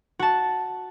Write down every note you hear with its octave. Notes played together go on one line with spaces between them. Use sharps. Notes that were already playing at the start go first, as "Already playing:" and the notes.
F#4 A5